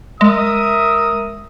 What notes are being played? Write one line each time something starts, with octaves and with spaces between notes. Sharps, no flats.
G#3 A#4 E5 D#6